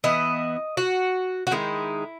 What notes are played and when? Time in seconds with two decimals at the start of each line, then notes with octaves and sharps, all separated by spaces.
0.04 E3 B3 E4 D#5
0.77 F#4
1.47 F#4
1.51 D#3 G#3 D#4 E4